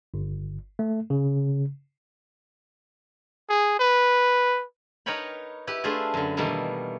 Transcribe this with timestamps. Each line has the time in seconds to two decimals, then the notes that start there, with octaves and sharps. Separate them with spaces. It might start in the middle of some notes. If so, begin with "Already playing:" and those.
0.14 G1
0.79 A3
1.10 C#3
3.49 G#4
3.79 B4
5.06 D#4 A#4 B4 C#5 G5 B5
5.67 E4 G4 B4
5.84 A3 D4 F4 G4 G#4
6.14 F#2 D3
6.37 B2 D#3 E3 G3 A3 A#3